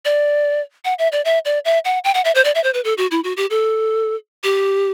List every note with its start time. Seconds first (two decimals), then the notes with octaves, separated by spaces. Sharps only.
0.05 D5
0.85 F#5
0.99 E5
1.12 D5
1.25 E5
1.45 D5
1.65 E5
1.85 F#5
2.04 G5
2.14 F#5
2.25 E5
2.35 C5
2.45 D5
2.55 E5
2.64 C5
2.74 B4
2.84 A4
2.98 F#4
3.11 E4
3.24 F#4
3.37 G4
3.50 A4
4.44 G4